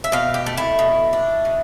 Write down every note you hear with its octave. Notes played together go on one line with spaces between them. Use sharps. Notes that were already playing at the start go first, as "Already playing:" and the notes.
E5
B2 F5
G4
A3
E4
B2
D4
B2